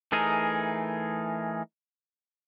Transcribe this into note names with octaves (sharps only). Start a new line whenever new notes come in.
E3 A3 D#4 G#4 A#4